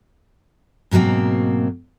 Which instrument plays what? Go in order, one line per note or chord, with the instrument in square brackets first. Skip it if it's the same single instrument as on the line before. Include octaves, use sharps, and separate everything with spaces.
[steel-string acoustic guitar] G#2 B2 F#3 A#3 C4